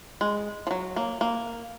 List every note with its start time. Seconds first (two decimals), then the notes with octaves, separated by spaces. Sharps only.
0.21 G#3
0.67 F3
0.71 F#3
0.96 A#3
1.21 A#3